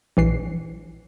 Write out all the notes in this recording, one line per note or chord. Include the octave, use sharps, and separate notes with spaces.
A#1 E3 C7